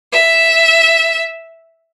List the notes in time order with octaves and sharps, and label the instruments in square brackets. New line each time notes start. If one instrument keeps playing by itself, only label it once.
[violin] E5